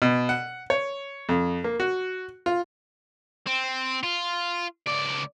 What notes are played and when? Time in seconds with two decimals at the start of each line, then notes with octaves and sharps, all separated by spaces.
0.02 B2
0.29 F#5
0.70 C#5
1.29 F2
1.64 A#3
1.80 F#4
2.46 F4
3.47 C4
4.03 F4
4.88 C#2 D5